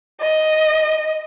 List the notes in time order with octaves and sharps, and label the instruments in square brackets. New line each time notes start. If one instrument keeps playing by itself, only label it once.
[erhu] D#5